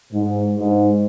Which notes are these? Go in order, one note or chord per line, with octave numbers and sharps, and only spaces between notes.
G#2
G#2